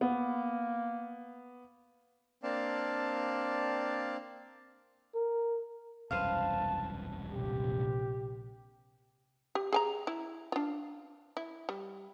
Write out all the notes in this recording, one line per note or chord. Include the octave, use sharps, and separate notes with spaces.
A#3 B3
A#3 C4 D4 D5 F5 A5
A#4
E1 C2 F#2 B4 C5 F5 A5
A#1 C3 G4
G4
G#4 G#5 A#5
E4
D4 F4
E4
G3